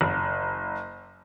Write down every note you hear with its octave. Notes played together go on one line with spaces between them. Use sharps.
F#1